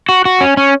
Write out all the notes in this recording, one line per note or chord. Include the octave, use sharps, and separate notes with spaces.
F#4
F#4
C#4
C#4